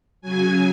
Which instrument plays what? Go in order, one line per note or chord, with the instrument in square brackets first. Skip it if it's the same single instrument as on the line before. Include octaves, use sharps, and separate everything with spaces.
[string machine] C#3 F#3 G#5